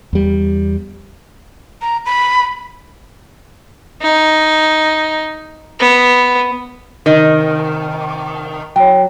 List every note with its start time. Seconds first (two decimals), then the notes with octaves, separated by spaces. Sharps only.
0.13 E2 G3
1.82 A#5
2.06 B5
4.02 D#4
5.80 B3
7.06 C3 D#3 D#5
8.76 F#3 C#5 G5